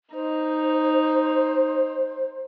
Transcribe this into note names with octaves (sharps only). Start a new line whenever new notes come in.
D#4 C5